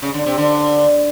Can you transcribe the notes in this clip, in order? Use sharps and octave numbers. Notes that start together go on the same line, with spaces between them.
C#3
D3
C3
D3